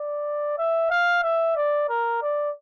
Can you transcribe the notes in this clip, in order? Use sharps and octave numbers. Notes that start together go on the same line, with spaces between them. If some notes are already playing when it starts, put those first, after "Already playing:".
Already playing: D5
E5
F5
E5
D5
A#4
D5